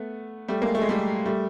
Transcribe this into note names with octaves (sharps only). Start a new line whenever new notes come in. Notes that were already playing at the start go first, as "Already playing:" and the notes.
Already playing: A3 B3
G3 A3
G#3 A#3
A3
G#3
G3 A3
G3 A3